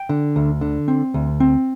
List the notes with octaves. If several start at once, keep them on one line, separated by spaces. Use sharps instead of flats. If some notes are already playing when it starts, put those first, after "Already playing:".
Already playing: G5
D3
D2
D3
C4
D2
C4